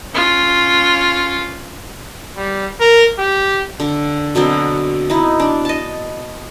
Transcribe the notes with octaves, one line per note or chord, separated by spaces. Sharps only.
C#4 F4
G3
A#4
G4
D3
B2 D3 F#3 C4
D#4 E4
D4
D#5 A5